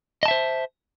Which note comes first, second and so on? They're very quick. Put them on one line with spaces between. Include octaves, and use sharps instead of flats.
D#5 A5 E5 C5